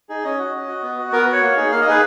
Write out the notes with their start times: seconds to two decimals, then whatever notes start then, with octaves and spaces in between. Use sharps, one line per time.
0.09 D#4 G#4
0.24 C#4 D#5
0.39 F#4
0.54 C#4
0.68 F#4
0.83 B3
0.98 F#4
1.12 B3 A#4
1.23 B4
1.27 F#4
1.32 C#5
1.42 A#3
1.57 D#4 G#4
1.72 A#3 F5
1.82 D#5
1.87 D#4 G#4 B4